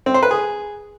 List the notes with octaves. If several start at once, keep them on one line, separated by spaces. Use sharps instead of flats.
C4
C5
B4
G#4